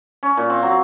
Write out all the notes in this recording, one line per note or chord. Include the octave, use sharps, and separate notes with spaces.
C#4
A#2
C4
F#3